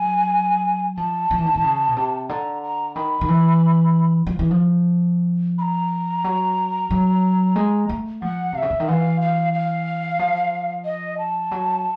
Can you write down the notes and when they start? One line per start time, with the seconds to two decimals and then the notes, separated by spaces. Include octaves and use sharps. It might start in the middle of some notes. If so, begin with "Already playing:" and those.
Already playing: F#3 G#5
0.97 F3 A5
1.31 F3
1.38 E3
1.46 D#3
1.54 E3
1.64 C#3
1.88 B2
1.96 C3
2.29 D3 A#5
2.63 A#5
2.95 D#3 B5
3.21 D#3
3.28 E3
4.27 F3
4.39 E3
4.51 F3
5.58 B5
5.62 A#5
6.24 F#3
6.91 F#3
7.56 G#3
7.89 A3
8.22 F3 F#5
8.53 C3 F5
8.58 C#3 E5
8.70 D3
8.80 D#3
8.88 E3 F5 F#5
9.21 F5
9.54 F5
10.19 F3
10.85 D#5
11.18 A5
11.51 F#3